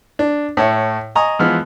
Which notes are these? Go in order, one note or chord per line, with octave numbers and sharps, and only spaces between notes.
D4
A2 C#5 E5
D#5 G#5 A#5 C#6 D#6
E3 F3 G#3 B3 F6